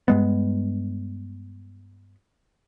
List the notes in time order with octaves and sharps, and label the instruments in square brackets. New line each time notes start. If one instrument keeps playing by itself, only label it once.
[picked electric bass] G2 G#3 B3